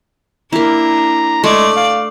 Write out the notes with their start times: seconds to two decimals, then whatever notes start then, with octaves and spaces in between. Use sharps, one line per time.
0.53 A#3 D4 E4 A#5
1.44 G#3 A3 D5
1.76 F5